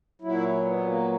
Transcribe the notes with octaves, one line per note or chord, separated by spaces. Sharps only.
A#2 F#3 E4
B3
A#3